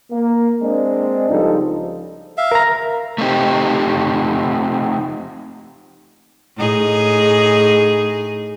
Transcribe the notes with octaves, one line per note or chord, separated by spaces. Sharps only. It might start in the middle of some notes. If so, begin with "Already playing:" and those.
A#3
G#3 C4 D4
C#2 F3 G3 D#4 A4
E5 F5
A#4 A#5
A3 C4 D#4 G4
A2 D#4 G#4